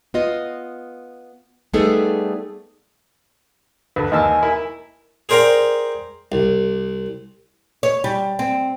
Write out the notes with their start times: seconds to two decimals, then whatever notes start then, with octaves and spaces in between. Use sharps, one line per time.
0.14 B3 F4 D#5
1.73 G3 A3 B3 D#4 G#4 A4
3.96 D2 A4 B4
4.12 D#2 A#3 D#4 D#5 G#5 A5 E6
4.43 E4 A#4
5.29 G#4 A#4 C5 D5 G5 A#5
6.32 C2
7.83 C#5
8.04 G3
8.39 C4